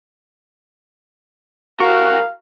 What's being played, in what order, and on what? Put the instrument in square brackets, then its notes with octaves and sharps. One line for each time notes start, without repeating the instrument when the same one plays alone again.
[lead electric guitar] C2 A#4 [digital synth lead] F#4 [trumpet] F5